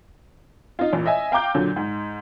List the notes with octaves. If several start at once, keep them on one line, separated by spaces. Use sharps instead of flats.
D#4 F4
A1 A#2
D#5 E5 G#5
F5 G5 A#5 D6 G6
A#2 D3 F#3
G#2